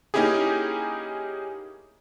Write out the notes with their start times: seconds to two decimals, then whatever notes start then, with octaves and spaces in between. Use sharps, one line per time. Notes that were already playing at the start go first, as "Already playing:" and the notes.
0.14 A#3 C#4 D#4 E4 G4 G#4